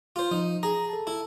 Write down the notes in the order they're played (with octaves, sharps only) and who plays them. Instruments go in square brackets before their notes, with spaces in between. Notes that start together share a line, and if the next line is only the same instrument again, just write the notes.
[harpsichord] F4 C5
[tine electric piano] F3 [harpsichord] D#4
[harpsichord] G#4 [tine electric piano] A#5
[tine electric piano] A4 A5
[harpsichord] E4